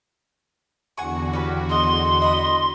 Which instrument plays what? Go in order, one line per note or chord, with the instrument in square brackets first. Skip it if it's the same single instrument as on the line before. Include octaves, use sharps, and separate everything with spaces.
[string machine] E2 D3 F#4 [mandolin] F#5 G#5 C#6
[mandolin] C#4 G4 B4
[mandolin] G#4 D#5 [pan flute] C6
[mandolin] D#5 B5 D#6